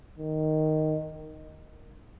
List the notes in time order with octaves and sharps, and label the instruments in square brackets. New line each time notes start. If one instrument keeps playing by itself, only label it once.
[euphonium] D#3